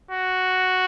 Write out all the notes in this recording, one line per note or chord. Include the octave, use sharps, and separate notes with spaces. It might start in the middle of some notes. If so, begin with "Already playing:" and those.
F#4